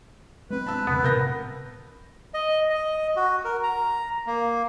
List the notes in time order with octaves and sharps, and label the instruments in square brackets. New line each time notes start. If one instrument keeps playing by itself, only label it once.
[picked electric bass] G#3 C4 [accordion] B4
[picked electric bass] C4 [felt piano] A5 E6
[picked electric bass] E1 C#3 [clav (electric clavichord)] B3
[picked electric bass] A2 C3 [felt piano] A#4 G6 A#6
[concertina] D#5
D#5
F#4
A#4
A#5
A#3